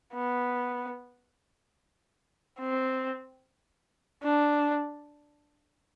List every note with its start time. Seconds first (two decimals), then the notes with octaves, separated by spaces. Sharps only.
0.13 B3
2.59 C4
4.23 D4